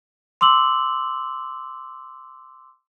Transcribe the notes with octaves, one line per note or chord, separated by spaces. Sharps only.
C6 D6 E6 F#7